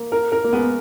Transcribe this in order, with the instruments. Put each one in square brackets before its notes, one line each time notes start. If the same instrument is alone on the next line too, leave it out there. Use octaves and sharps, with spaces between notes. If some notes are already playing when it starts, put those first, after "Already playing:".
Already playing: [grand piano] A#3
[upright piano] A#4
A#4
[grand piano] A#3
[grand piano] G#3 [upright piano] B3